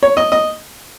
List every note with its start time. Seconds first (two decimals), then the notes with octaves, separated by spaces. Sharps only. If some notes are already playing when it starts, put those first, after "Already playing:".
0.03 C#5
0.17 D#5
0.32 D#5